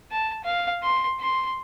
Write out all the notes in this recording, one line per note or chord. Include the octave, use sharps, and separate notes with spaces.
A5
F5
C6
C6